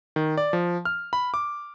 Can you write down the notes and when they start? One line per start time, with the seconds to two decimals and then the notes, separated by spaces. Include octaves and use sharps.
0.16 D#3
0.38 D5
0.53 F3
0.85 F6
1.13 B5
1.34 D6